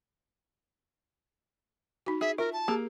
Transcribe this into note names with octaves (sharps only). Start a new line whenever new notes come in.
D#4 F#4
G#4 E5
F4 A#4 E5
A5
A#3 G4 G#4 A#4